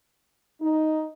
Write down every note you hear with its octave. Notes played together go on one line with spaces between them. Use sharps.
D#4